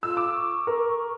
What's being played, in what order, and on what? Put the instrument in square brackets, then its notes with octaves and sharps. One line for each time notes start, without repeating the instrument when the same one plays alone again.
[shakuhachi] F4 [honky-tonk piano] E6
[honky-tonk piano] D6
[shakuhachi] C#6
[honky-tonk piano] A#4